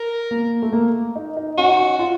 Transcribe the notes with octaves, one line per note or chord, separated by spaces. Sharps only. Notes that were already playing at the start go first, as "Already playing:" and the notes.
Already playing: A#4
A#3
A3
A#3
D#4
D#4
C#4 F#4
D#4
C#4
F4